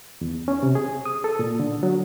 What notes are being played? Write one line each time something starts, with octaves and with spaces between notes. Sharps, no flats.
E2
C#4
C3
G#4
D#6
A4
A#2
D3
F#3